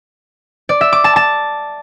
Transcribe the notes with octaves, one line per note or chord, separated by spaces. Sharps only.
D5
E5
D6
A5
A5